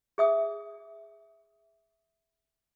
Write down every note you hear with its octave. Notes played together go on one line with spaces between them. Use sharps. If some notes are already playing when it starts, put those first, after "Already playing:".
G#4 E5 D#6